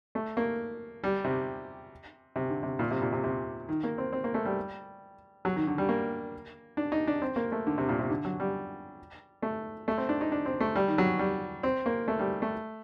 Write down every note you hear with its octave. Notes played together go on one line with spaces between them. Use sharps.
A3
A#3
G3
C3
C3
D3
C3
A#2
C3
A#2
C3
C3
D#3
A#3
C4
C4
A#3
A3
G3
F#3
D#3
D3
G3
A#3
D4
D#4
D4
C4
A#3
A3
D3
C3
A#2
C3
D3
F#3
G3
A3
A3
C4
D4
D#4
D4
C4
A3
G3
D#3
F#3
G3
C4
A#3
A3
G3
A3